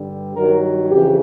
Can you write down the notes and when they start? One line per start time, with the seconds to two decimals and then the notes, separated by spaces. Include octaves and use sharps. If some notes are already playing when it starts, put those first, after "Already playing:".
Already playing: G2 D3 G3
0.35 G2 D#3 F#3 A#4
0.90 F2 C#3 E3 G4